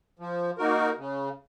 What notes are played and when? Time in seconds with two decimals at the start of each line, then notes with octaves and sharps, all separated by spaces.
0.19 F3
0.58 A#3 D#4 F#4 A#4
0.98 C#3